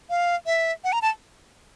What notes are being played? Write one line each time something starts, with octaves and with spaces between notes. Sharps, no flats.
F5
E5
F#5
A#5
A5